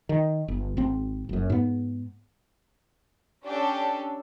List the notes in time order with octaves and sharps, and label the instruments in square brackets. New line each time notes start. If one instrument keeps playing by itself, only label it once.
[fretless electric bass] D#3
G1
G#1 C4
F#1 F#2
G#2 B3
[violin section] C#4 D4 G4 A4